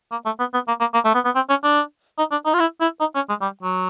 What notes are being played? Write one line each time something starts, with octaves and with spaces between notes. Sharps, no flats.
A#3
A3
B3
B3
A#3
A#3
A#3
A3
B3
B3
C4
C#4
D4
D#4
D4
D#4
F4
E4
E4
D#4
C#4
G#3
G3
F#3